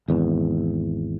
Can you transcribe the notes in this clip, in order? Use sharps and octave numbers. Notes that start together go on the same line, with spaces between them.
G#1 E2